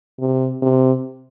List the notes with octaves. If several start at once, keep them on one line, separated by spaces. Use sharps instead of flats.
C3
C3